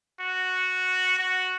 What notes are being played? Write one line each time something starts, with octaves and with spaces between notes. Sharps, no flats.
F#4
F#4